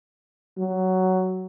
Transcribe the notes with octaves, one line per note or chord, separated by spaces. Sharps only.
F#3